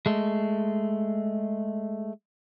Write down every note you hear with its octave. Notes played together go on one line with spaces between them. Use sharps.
G#3 A3